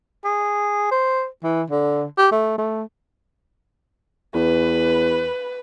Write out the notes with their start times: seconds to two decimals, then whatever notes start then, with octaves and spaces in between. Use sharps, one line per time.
0.24 G#4
0.91 C5
1.43 E3
1.70 D3
2.18 G4
2.32 A3
2.58 A3
4.35 E2 B4